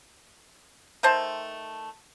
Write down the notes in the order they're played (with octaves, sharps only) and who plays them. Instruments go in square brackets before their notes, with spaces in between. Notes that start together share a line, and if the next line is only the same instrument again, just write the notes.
[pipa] D#3 A3 C5 A5